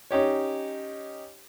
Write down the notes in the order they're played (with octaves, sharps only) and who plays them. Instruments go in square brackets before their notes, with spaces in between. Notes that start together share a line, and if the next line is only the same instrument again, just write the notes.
[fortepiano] C#4 D#4 G4 C#5